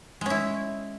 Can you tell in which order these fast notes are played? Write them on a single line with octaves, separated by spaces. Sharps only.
G#3 C#4 E4